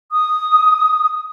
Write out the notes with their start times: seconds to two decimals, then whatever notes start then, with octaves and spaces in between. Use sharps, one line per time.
0.12 D#6